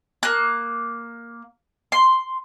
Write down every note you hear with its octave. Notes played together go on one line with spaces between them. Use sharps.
A#3 F#6
C6